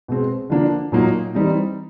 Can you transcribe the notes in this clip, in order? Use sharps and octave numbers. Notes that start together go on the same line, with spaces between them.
B2 G#3 C4
D3 F3 A#3 D4
A#2 F#3 A#3 D#4
E3 G3 C4 D#4